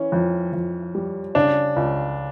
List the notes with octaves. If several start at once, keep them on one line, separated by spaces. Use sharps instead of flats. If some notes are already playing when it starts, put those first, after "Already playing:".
Already playing: E3 C#4
F2
F2
G3
C#3 D4
C#2